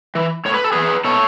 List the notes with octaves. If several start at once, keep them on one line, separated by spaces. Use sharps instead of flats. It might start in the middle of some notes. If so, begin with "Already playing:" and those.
E3
A2 C#5
B4
A4
E3 G#4 B4
B2 A4 C#5